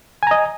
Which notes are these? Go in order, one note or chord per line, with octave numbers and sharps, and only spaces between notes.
D#5 G#5 A#5